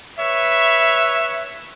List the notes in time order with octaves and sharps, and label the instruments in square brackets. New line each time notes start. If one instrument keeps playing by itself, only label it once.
[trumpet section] B4 C#5 E5